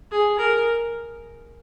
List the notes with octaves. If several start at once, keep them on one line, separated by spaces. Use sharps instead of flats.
G#4
A#4